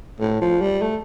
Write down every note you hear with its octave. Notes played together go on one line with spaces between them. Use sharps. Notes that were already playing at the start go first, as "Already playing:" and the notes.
A2
F3
G3
A3